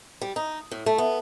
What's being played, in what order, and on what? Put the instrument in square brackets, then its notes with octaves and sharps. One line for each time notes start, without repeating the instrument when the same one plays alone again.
[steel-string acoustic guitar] G3
D#4
A2
A3
B3